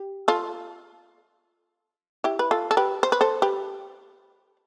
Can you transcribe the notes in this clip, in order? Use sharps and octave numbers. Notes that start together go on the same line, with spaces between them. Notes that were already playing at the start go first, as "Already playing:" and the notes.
Already playing: G4
F4 A4
E4 G4
B4
F4 A4
A4
G4 B4
C5
B4
A4 C5
G4 B4